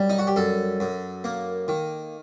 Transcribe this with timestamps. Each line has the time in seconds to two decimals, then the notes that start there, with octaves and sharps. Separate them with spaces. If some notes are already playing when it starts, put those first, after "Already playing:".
Already playing: F#2 G3
0.10 D#4
0.19 F#4
0.27 G4
0.36 F#2 A4
0.80 F#2
1.24 A#3
1.68 D#3